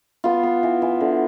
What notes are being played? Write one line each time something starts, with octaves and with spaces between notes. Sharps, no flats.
B3 F4
B3
E3
E3
D3